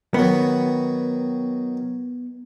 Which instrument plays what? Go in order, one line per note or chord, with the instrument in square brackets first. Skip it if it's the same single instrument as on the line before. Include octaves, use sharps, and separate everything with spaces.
[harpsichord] D#3 F#3 [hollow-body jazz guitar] B3